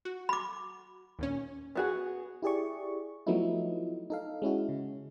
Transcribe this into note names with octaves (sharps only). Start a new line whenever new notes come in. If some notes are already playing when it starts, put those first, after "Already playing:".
F#4
B5 D6
D#2 A#2 C#4
B3 F#4 G#4
E4 G4 G#4 D5 C#6
F3 F#3 A3 B3 D#4 E4
D#4 A4 F5
G#3 C#4 E4 F#4
C#3